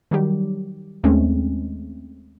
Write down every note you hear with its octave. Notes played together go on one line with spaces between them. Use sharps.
D#3 F#3 G3 G4
D#2 G#3 A3 C4 C#4